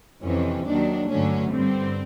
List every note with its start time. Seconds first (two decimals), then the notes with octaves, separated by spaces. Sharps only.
0.23 F2 C3 E3 C#4
0.66 D#2 D#3 F#3 D4
1.08 G2 D3 F#3 A3 C#4
1.50 G2 D3 G3 C4